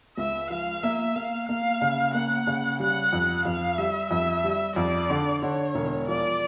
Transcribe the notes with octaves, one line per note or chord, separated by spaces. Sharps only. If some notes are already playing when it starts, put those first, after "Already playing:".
C#2 E5
F3 F5
A#3 E5
A#3 F5
A#3 F5
C#3
A#3 F#5
C#3
G3 F#5
F2
F2 F5
G3 E5
F2 E5
G3
F2 D5
D3
D3 C#5
E1
F3 D5